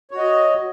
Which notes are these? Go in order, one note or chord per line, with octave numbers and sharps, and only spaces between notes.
F#4 C#5 D#5